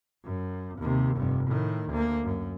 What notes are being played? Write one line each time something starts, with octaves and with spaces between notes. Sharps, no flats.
F#2
D#2 C3
F1 G2
A2 D#3
D2 A#3
F#2